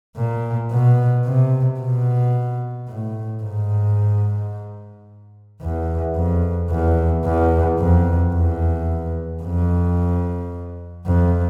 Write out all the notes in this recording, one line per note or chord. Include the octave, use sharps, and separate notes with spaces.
A#2
B2
C3
B2
A2
G#2
E2
F2
E2
E2
F2
E2
F2
F2